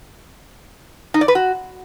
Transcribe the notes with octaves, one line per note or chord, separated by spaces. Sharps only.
D#4
D5
B4
F#4